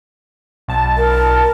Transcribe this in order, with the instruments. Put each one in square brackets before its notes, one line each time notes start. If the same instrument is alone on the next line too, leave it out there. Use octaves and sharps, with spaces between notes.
[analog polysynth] B1 A5
[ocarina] A#4